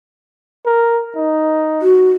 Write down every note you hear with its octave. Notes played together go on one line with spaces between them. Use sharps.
A#4
D#4
F#4